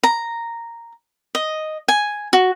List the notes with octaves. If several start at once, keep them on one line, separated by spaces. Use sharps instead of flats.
A#5
D#5
G#5
F#4